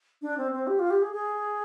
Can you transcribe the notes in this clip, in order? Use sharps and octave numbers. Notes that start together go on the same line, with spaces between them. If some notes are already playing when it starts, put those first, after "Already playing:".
D4
C4
C4
G4
F4
G4
G#4
G#4